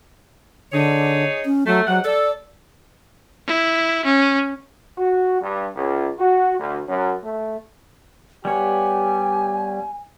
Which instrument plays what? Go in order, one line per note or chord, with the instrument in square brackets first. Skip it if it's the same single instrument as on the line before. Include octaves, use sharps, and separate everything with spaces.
[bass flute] D3 [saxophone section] D#4 G#4 C#5
[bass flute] C#4
[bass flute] F#3 [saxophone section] A3
[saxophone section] G#2 G3 F#5 [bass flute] F#3
[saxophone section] A4 [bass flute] D5
[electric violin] E4
C#4
[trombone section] F#4
G2
C#2
F#4
D2
F#2
A3
[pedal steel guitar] G3 B3 C#5 [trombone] G4 [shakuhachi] G#5